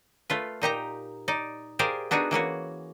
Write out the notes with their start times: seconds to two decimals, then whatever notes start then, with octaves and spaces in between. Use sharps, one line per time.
0.30 A3 F4 B4
0.62 A#2 D#4 G4 A#5
1.28 D#4 D5
1.79 G4 G#4 A#4 C5 D5 F5
2.11 B3 D4 D#4 F#4 G#4
2.31 E3 A#3 C#4 F#4